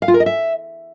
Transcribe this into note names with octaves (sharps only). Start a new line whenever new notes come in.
F5
F4
A#4
D#5
E5